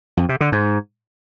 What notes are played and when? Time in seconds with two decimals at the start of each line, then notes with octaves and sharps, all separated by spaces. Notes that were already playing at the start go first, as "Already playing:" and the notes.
0.17 F2
0.29 C3
0.41 D3
0.52 G#2